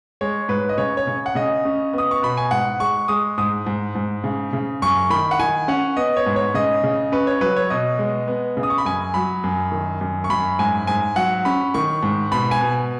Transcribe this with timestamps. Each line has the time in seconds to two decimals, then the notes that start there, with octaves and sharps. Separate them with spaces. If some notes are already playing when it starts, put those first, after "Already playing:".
0.21 G#3 C#5
0.49 G#2 B4
0.69 D#5
0.78 C#3 C#5
0.97 C#5
1.07 C#3
1.26 F#5
1.35 C#3 D#5
1.65 C#4
1.93 B3 D#6
2.11 C#6
2.22 B2 B5
2.37 G#5
2.51 G#2 F#5
2.80 G#3 C#6
3.08 G#3 D#6
3.38 G#2 D#6
3.66 G#2
3.95 G#2
4.24 C#3
4.53 C#3
4.82 F#2 C#6
5.10 D#3 B5
5.31 F#5
5.39 D#3 G#5
5.68 C#4 F#5
5.97 B3 D#5
6.17 C#5
6.26 G#2
6.36 C#5
6.54 C#3 D#5
6.84 C#3
7.12 C#4 B4
7.27 C#5
7.41 F#3 B4
7.57 C#5
7.70 B2 D#5
7.99 G#3
8.28 B3
8.57 C#3
8.63 D#6
8.70 C#6
8.78 B5
8.85 F#2 G#5
9.14 F#3 B5
9.44 F#2
9.72 D#3
10.01 F#2
10.24 C#6
10.30 F#2 B5
10.59 G#2 G#5
10.87 G#2 G#5
11.16 F#3 F#5
11.45 C#4 B5
11.74 D#3 C#6
12.03 G#2
12.31 B2 B5
12.51 G#5
12.61 B2